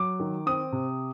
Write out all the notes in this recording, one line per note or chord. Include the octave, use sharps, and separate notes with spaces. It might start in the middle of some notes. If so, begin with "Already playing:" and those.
Already playing: F#3 D6
D#3
C4 D#6
C3